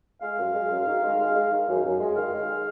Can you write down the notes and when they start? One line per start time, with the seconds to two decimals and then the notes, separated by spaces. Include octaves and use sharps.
0.22 G#3 F5
0.39 F#2
0.55 G#3
0.71 F#2
0.87 D#3
1.03 G#3
1.19 G#3
1.35 G#3
1.52 D#3
1.68 F#2
1.84 F#2
2.00 G#3
2.16 D#3 F5
2.33 G#3
2.49 G#3